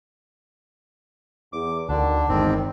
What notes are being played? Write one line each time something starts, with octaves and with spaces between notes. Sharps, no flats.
E2 D6
D2 D3 D#3 D4 F#4
G1 E2 D#3 G#3 C4